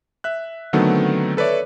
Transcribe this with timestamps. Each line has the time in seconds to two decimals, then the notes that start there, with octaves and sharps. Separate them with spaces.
0.24 E5 F#6
0.73 D3 D#3 F#3 A3 B3 C4
1.37 A4 B4 C#5 D5 E5